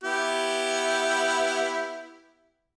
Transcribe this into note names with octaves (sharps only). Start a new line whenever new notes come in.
B3 E4 G4